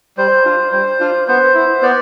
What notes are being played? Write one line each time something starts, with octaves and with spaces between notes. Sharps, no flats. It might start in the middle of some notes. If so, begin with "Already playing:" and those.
G3 C5
D4 F4
G3 C5
D4 F4
B3 C5
E4
B3 D5